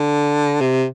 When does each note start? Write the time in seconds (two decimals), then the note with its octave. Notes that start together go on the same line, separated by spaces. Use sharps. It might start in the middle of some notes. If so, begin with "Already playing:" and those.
Already playing: D3
0.61 C3